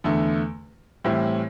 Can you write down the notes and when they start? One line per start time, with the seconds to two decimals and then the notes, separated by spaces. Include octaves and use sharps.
0.04 E2 D3 A3
1.04 A2 E3 G3 C4 E4